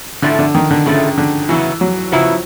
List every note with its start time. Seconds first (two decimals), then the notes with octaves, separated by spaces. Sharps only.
0.22 A2 D3 F3 A3
0.39 D3
0.55 D#3
0.71 D3
0.86 A2 C#3 F3 A3
1.18 D3
1.49 C#3 E3 F#3 B3 E4
1.81 F#3
2.12 C#3 F3 F#3 B3 E4